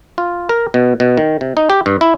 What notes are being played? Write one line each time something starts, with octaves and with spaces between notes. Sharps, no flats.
F4
A#4
B2
B2
D#3
C3
D#4
G4
G2
E4